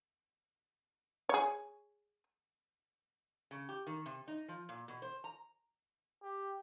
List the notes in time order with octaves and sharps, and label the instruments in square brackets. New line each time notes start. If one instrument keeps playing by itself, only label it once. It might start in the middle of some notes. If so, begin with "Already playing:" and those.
[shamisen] G#4 C#5
[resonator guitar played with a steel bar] C#3
G4
D#3
C3
D#4
F3
A#2
B2
C5
A#5
[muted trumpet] G4